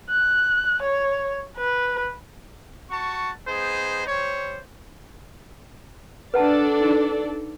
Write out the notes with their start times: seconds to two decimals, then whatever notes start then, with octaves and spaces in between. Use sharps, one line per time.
0.10 F#6
0.83 C#5
1.57 B4
2.90 F#4 A5 C#6
3.47 B3 D#4 G#4 C5
4.07 G3 C5 C#5
6.34 D4 A4 B4 D5 F#5 A5
6.80 D#4